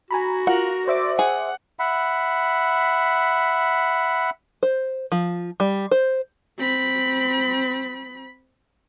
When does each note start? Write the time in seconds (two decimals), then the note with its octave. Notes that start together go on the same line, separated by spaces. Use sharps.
0.11 F#4 G#5 A#5 B5
0.47 F4 A#4 F#5
0.88 C5 D5 E5 D6
1.19 G#4 F#5
1.79 E5 F#5 B5
4.63 C5
5.12 F3
5.60 G3
5.91 C5
6.58 C4 B5